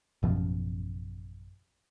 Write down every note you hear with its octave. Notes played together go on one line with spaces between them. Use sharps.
A1 F#2 B2 F3